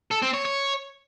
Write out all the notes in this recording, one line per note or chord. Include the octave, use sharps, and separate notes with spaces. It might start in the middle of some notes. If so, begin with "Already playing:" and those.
A4
C4
C#5
C#5